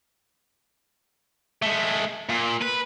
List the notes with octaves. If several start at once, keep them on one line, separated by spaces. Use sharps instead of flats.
G#3 A3
A#2
B4